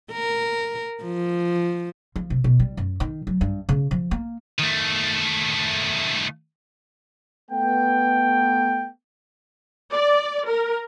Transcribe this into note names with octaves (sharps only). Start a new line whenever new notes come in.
A#4
F3
F3
C3
B2
G3
F#2
D#3
F#3
G2
C#3
F3
A#3
D#3 A3
A3 B3 G5
D5
A#4